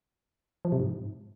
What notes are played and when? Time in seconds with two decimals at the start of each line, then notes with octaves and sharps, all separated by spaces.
0.65 F3
0.72 C3
0.80 G#2